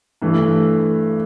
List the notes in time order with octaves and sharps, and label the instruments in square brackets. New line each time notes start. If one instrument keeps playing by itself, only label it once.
[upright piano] G2 E3 A3